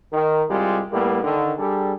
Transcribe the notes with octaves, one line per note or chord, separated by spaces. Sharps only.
D#3
C2 G3 G#3 F4
A2 G3 A#3 B3
D3 D#3
G3 D4 G#4 A4